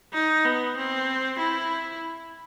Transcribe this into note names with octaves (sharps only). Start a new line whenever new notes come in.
D#4
B3
C4
E4